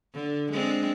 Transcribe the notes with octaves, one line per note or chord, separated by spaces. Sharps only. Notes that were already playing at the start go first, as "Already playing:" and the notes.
D3
G#3 C4 D4